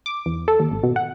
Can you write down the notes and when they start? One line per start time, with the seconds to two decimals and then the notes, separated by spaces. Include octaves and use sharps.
0.06 D6
0.26 E2
0.48 A4
0.60 D#2
0.71 G#1
0.83 B2
0.96 F#5